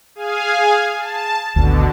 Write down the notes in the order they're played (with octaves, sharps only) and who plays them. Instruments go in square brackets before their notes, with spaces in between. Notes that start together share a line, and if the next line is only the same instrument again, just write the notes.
[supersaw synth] G#4 F5 G#5
A5
[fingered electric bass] G#1 D2 [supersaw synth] B2 D3